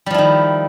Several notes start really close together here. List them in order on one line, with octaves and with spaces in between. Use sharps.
G3 F3 E4 D#3